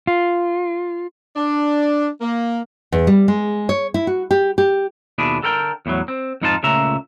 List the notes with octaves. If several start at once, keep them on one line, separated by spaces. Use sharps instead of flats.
F4
D4
A#3
E2
G3
G#3
C#5
E4
F#4
G4
G4
D#2 B2 D4 E4 G#4
D3 A4 A#4 G5
E2 A2 D3 F#3
C4
F2 G#2 D#4 F4 B4 A5
C#2 A#2 C#3 A3 E5 A#5